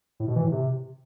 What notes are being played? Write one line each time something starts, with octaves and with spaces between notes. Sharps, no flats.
A2
B2
E3
A2
C3